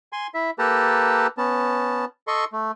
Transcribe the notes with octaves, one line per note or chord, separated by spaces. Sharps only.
G#5 C6
E4 E5
A#3 G4 A4 B4 A5 A#5
B3 C#4 A5
A4 D#5 C6 C#6
A3